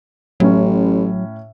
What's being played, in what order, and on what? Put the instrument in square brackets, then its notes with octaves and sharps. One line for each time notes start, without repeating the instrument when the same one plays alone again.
[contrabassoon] A1 [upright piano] A2 C#4 [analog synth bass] F#3